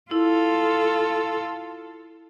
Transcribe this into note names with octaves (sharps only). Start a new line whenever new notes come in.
E4 F4 A4